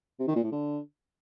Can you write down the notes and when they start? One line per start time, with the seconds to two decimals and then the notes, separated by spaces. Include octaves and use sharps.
0.19 C3
0.27 D#3
0.36 A#2
0.44 A2
0.52 D3